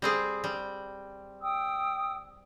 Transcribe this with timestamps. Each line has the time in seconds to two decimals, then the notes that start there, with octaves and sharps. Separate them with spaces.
0.02 G3 C4 G#4
0.44 G3
1.42 G5 D#6 E6